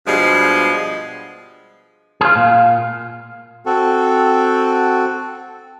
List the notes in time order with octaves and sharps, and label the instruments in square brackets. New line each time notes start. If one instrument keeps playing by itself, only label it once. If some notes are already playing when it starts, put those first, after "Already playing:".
[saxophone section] G2 B2 F3 G3 G#3
[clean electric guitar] F4 G#4
[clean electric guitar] A#2 [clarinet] F5
[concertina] C4 F#4 A4